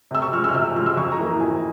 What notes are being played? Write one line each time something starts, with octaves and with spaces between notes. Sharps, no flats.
C3 E6
C#6
F3 F6
G#3
E6
F6
C3 E6
F3 G#3 F6
E6
F2 C#6
A#5
E3 A#3
A#5
F2 G#5